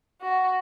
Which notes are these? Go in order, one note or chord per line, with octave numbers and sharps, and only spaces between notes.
F#4